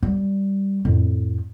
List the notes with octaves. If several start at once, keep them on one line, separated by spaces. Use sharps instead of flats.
G3
F2 A2